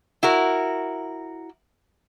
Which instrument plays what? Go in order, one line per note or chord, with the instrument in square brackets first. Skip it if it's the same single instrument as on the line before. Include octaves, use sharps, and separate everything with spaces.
[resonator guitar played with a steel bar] E4 F#4 A#4